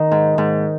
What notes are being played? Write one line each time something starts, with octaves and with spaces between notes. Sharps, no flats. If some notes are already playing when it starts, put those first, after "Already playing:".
Already playing: D#3 D#4
G#2
G#2